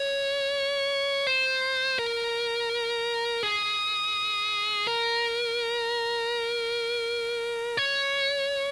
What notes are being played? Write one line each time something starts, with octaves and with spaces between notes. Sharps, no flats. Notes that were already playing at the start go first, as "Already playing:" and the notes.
Already playing: C#5
C5
A#4
G#4
A#4
C#5